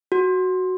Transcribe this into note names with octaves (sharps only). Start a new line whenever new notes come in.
F#4